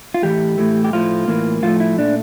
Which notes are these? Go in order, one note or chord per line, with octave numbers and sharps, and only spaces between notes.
F4
A2 E3 A3 G4
A2 E3 A3
G4
A2 F3 A3 F4
A2 E3 A#3
A2 F3 A3 F4
E4
A#2 A3 D4